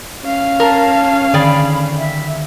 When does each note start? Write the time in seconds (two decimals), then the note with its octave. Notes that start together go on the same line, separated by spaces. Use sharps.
0.24 C#4 F5
0.60 A#4 A5
1.34 D3 D#3 G#4 D5 G5 B5
1.97 E5